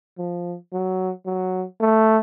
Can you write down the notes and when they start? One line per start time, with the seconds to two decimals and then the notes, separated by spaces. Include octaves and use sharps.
0.18 F3
0.73 F#3
1.26 F#3
1.81 A3